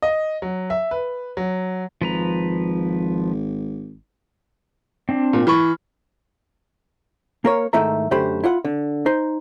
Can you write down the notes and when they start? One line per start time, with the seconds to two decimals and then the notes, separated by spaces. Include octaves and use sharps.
0.02 D#5
0.42 F#3
0.70 E5
0.91 B4
1.37 F#3
2.02 G#1 F3 B4 A#5
5.09 C4 D4
5.33 A#2
5.47 E3 B5 C#6 F6
7.45 A#3 A#4 C#5
7.73 G#2 D#3 A3 E4 E5 A#5
8.11 F#2 D3 A3 G4 C5 B5
8.44 E4 F4 F#5
8.64 D3
9.06 D#4 C5